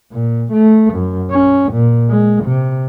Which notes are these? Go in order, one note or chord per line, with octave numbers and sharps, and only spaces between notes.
A#2
A3
F#2
C#4
A#2
G#3
C3